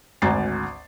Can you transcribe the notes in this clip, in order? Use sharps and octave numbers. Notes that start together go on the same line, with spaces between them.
G#1 D2 G#5 A#5 A6 C7